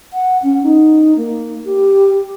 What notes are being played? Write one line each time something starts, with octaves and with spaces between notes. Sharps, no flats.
F#5
C#4
D#4
A#3
G4